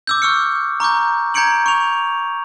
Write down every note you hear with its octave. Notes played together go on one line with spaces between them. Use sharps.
D6 E6 G6
C#6 E6 F6 C#7
A#5 C#6 D6 G6
A#5 G6 G#6 C#7 D7 F#7
C#6 F7